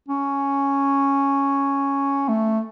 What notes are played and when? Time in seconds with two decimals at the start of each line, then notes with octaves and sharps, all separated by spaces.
0.08 C#4
2.28 A3